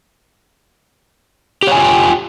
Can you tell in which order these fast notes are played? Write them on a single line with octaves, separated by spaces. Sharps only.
G4 C#5 G#5 F4 G5